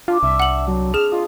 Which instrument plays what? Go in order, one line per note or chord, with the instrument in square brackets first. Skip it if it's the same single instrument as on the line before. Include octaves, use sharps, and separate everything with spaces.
[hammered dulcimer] D4 G4 [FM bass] F4
[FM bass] C2 [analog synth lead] E5
[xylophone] F#5 F#7
[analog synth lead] F#3 [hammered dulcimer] C4 A4
[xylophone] G#4 E7 [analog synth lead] F6
[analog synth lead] F4 [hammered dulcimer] D#5